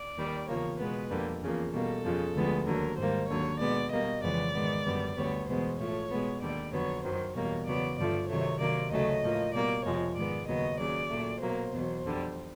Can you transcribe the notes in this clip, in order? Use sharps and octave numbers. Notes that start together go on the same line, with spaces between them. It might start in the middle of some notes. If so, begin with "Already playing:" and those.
Already playing: D5
D#2 D#3 G3
E2 C#3 F3 A#3 C#5
B2 G#3 B3 B4
F2 D3 G3 A#3
E2 C#3 F3 A#3
B2 G3 A#3 A4
F2 C#3 F3
D2 D3 F3 G#3 B3
D#2 D3 F#3 A#4
G#2 D#3 G3 A#3 C5
D#2 D3 F#3 C#5
B2 G#3 B3 D5
B2 G3 A#3 D#5
F2 C#3 E3 G#3 B3 D5
G#2 D#3 G#3 B3
F#2 D3 G3 B3
D2 D3 G3 B3 C#5
E2 B2 G#3 B3 C5
A2 F3 A3 C#5
B2 G#3 B3
D#2 D3 G3 D5
F2 D3 F#3 B3 C#5
F#2 D#3 F#3 C5
E2 B2 G3 A#3 C#5
E2 C#3 F#3 B3 D5
G2 D3 F3 A3 D5
C3 D#3 F#3 A3 C#5
C3 D#3 F#3 A#3 D5
D2 C#3 F#3 A3 D#5
A2 F3 A#3
B2 G3 A#3 D5
F2 C3 F3 G#3 C#5
G#2 D#3 G#3 B3 D5
D#2 C#3 F#3 B3 D#5
D#2 C#3 F#3 D5
A#2 F#3 A3
B2 F#3 A#3 C5
E2 B2 F#3
F2 D3 G3